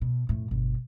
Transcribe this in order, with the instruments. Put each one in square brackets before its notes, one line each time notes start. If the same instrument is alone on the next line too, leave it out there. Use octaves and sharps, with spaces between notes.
[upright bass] B2
F2 A2
G1 B2